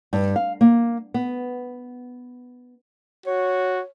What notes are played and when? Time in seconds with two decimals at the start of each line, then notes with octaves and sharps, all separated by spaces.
0.13 G2
0.36 F5
0.61 A#3
1.14 B3
3.26 F#4 C#5